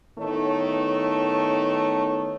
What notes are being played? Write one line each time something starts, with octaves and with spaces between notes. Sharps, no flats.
A2 D#3 A3 B3 C#5